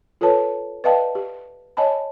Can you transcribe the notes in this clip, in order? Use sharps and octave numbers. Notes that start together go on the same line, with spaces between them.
F4 A4 B4 C#5 A5
B4 D5 D#5 F5 G5 A5
G4
C#5 D#5 G#5 A5 B5